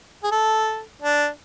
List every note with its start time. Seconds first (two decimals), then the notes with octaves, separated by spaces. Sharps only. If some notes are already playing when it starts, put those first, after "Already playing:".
0.23 G#4
0.32 A4
1.02 D4